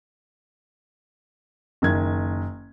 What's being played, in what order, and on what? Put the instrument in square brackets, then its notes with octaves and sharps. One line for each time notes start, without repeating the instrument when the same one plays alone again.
[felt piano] F#1 D#3 G#6